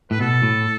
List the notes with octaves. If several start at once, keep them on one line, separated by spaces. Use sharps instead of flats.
A2 B4
B2 A4
A2